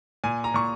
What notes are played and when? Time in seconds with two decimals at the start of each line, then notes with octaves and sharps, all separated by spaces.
0.24 A#2 G#5
0.44 A#5
0.54 A#2 C#6